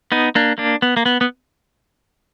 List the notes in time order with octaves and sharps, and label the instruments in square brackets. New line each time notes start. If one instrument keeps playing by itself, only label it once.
[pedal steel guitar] B3 D#4
A#3 D4
A#3 D4
B3
A#3
B3
B3